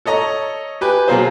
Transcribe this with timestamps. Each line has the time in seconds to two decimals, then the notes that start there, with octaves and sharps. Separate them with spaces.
0.05 A4 C#5 D#5 A#5
0.81 G4 B4 G5 G#5
1.08 B2 F#3 A#3 G#4 C5